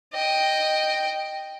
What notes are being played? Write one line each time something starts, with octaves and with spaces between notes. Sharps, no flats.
D#5 G5